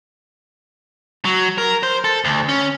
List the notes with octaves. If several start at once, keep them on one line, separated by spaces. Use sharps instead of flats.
F#3
A#4
C5
A4
D2
C#4